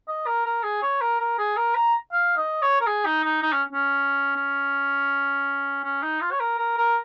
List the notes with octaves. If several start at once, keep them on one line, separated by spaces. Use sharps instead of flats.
D#5
A#4
A#4
G#4
C#5
A#4
A#4
G#4
A#4
A#5
F5
D#5
C#5
A#4
G#4
D#4
D#4
D#4
C#4
C#4
C#4
C#4
D#4
F4
C#5
A#4
A#4
A#4